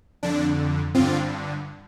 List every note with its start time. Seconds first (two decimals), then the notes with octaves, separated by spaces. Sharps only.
0.23 F2 D3 D4
0.94 G2 D3 C4 F4